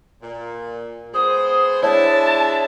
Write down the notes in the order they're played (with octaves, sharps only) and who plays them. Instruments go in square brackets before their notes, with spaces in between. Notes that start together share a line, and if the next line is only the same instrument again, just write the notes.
[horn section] A#2
[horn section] G#3 B3 C5 [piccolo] D#6
[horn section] G#3 D4 E4 [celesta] C#5 [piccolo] A5